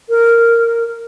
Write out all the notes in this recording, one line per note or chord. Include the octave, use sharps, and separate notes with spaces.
A#4